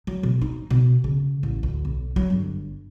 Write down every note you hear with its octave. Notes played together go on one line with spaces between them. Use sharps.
F#3
B2
D#4
B2
C#3
A1
D2
B1
F#3
G1